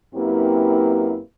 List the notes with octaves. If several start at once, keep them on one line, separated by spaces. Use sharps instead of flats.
F#2 A#3 C4 E4 G4 B4